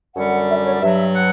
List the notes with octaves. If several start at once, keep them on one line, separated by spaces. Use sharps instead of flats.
F#2 D3 G3 F#5
E5
D5
C#5
D5
G2 F#3 E5
F#5